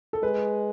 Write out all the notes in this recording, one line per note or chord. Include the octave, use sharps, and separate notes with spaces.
A4
G#3 B4